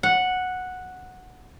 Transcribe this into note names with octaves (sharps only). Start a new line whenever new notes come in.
F#5